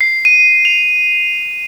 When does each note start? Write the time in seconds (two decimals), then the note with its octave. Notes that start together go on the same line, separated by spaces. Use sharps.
0.01 C7
0.25 D#7
0.65 F7